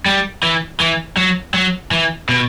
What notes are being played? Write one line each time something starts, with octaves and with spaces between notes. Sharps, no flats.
G3
E3
E3
F#3
F#3
E3
B2